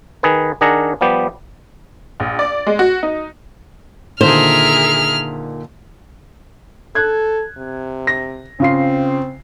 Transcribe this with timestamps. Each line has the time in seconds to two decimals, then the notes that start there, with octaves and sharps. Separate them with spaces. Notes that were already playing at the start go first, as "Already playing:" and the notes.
0.23 D#3 G#4 B4
0.61 D#3 D4 G#4 A#4 F#5 A#5
1.01 F3 G3 B3 G4
2.20 A#1
2.39 D5
2.67 G#3
2.79 F#4
3.03 D#4
4.21 A#2 D3 D#3 G#4 A#4 C5 E5 F6
6.95 A4 F#6 G#6
7.58 C3
8.07 A#6
8.60 C#3 C4 F4 C7